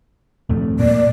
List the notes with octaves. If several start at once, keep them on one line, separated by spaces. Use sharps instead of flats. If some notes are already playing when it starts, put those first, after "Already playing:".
D#1 F2 A3
A#2 A#3 D5